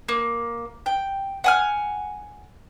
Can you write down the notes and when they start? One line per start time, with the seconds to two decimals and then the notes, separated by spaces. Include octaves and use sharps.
0.09 A#3
0.86 G5
1.44 F#5 G#5 F6